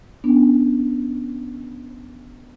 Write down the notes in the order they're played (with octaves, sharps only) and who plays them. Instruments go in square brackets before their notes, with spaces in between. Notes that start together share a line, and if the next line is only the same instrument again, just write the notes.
[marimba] B3 C#4 D4